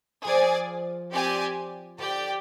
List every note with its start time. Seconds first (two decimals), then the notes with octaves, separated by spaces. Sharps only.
0.24 F3 G#4 D5 G#5
1.11 C4 G4 D5 G#5
1.98 D3 G4 D5 G5